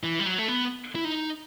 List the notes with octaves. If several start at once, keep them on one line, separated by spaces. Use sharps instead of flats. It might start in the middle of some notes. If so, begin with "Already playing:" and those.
E3
G3
F#3
A3
B3
E4
D#4